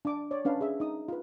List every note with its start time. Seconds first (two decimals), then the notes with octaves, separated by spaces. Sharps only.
0.05 D4 D6
0.31 C#5 D5
0.45 C#4 D4 B4 F5
0.61 G#4 E5
0.80 D#4 D#6
1.08 F4 B4